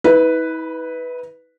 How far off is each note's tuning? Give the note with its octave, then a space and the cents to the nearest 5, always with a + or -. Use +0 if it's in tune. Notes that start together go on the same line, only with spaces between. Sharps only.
E4 -45 B4 +0